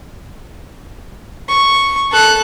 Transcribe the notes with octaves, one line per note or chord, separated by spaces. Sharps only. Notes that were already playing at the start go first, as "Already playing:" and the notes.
C#6
A4 F#6